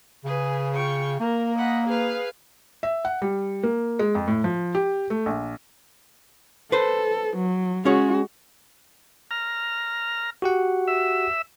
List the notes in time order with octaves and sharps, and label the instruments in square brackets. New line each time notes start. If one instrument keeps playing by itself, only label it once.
[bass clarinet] C#3 [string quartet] G#4 B4
[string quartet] F4 G5 C#6
[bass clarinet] A#3 [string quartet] A#4
[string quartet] D#5 F#5 B5
G#4 B4 F5
[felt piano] E5
F#5
G3
A#3
G#3
F2
A2
F3
G4
A3
A#1
[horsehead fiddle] A4 [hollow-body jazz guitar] B4 C5
[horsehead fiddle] F#3
[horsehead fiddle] G#3 F#4 [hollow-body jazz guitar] C#4 G#4 C#5
[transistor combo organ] A#5 F6
[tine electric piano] F#4 G4 F#5
[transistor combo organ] E5